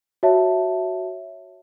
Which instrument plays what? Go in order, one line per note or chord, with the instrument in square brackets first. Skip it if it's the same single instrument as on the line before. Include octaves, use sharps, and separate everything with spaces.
[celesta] F#4 C#5 E5 A5